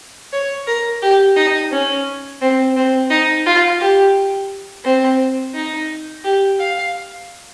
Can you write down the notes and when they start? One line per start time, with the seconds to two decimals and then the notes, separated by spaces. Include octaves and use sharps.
0.33 C#5
0.67 A#4
1.02 G4
1.36 D#4
1.72 C#4
2.42 C4
2.76 C4
3.11 D#4
3.46 F4
3.80 G4
4.84 C4
5.54 D#4
6.24 G4
6.60 F5